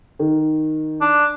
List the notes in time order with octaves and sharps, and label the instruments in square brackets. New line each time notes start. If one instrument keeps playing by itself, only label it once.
[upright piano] D#3
[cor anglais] D4